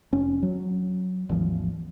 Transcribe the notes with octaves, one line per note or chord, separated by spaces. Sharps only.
F1 C#4
F#3
G#1 D#2 E3 F3